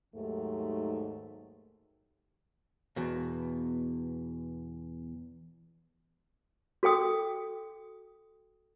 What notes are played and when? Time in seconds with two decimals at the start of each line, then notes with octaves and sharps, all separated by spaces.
0.15 D#2 G#2 D#3 F#3 A3
2.96 E2 B2
6.83 F#4 A4 G5 D#6